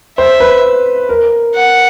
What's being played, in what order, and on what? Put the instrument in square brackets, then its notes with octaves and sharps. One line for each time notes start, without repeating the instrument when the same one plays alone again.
[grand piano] C5 [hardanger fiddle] E5
[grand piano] B4
A#4
[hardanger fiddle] F#5